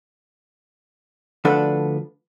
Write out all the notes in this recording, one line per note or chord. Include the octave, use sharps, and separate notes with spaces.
D2 F3 D4 A4 B4 F#5